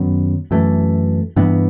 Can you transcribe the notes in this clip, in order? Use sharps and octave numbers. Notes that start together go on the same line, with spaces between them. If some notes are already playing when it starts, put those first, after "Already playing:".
Already playing: F#2 D#3 F#3 B3
F#2 E3 A3
G2 E3 B3